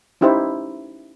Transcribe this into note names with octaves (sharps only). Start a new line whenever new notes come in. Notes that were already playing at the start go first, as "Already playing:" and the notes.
C#4 D#4 E4 G4 C5